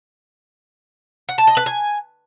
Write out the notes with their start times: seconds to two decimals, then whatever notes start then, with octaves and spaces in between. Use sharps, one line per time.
1.29 F#5
1.38 A5
1.47 D#5
1.57 B4
1.66 G#5